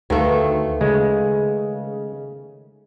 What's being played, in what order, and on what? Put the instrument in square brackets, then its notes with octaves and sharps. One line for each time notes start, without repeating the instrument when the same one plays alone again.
[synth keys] D2 [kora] D#3 A3 [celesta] B4 F5
[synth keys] C#3 [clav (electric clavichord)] G#3